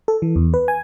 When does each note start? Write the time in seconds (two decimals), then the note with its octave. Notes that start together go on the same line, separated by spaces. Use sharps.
0.08 A4
0.22 E3
0.36 E2
0.54 B4
0.68 G#5